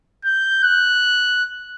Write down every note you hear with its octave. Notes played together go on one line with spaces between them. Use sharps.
G6
F#6